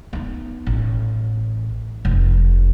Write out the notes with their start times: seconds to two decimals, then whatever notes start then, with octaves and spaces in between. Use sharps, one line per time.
0.13 B3 D#4
0.67 A1
2.05 F1